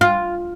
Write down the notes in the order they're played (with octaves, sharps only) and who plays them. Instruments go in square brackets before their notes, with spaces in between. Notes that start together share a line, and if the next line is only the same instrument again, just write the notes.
[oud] F4